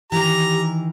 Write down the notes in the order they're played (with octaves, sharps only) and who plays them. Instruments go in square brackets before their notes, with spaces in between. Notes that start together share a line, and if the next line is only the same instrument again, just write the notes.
[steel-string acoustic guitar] D#3 E3 [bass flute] G4 [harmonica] A#5